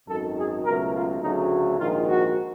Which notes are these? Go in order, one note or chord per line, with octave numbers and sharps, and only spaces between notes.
G#1 F#2 D#3 A4
G#4
C#2 B2 F#3 A3 A#4
F4
D2 C#3 F#3 A3 D#4
A#1 G#2 D#3 F4
F#4